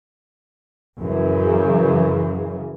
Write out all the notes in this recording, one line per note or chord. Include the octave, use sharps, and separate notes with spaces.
F#2 C#3 E3